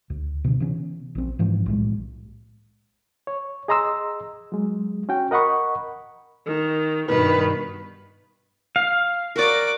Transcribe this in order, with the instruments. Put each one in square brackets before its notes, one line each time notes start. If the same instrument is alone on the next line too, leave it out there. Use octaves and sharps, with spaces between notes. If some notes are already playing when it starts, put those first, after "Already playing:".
[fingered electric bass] D2
B2 D3
C3 E3 B3 C#4
A#1 C4
G#2 E3 F3 C#4
B1 A2 G#3
[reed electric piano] C#5
G#4 D#5 A#5 C6 E6
F#3 G#3
C#4 F#4 G5
A#4 D#5 F#5 B5 C#6
[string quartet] D#3
[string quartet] G2 B2 D#3 [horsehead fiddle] B4
[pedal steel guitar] F5
[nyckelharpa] F#4 D6 [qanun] A#4 D5